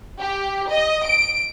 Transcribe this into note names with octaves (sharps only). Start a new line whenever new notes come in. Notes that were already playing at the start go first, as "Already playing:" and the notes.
G4
D#5
D7